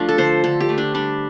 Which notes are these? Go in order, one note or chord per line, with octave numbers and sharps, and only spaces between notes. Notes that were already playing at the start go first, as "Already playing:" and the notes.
Already playing: F3 A3 D4 F4
A4
D3 C5
D3 A4
G4
A3
D4
G3 D4